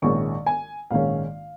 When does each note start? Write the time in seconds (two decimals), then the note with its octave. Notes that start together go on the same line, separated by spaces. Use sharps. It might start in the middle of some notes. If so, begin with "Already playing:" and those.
0.02 A#1 G#2 D#3 C#4 C#6
0.46 G#5
0.91 A#1 G#2 D#3 C#4 F5